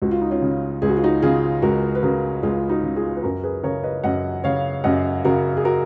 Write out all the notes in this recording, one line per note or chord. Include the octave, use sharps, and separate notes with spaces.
C#2 F#4
F4
D#4
C#4 F4
C#3
C#2 G#4
F#4
F4
D#4 F#4
C#3 F4 G#4
C#2 F#4 A#4
B4
C#3 F#4 A#4
C#2 F4 G#4
D#4 F#4
C#3
F4 G#4
B4
F#2 F#4 A#4
G#4 B4
C#3 A#4 C#5
B4 D#5
F#2 D#5 F#5
C#3 C#5 F5
F#2 D#5 F#5
C#3 F#4 A#4
G#4
F#4 A#4